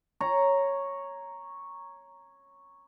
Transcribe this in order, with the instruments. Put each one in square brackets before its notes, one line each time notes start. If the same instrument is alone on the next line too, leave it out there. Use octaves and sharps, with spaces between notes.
[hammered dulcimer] C#5 A#5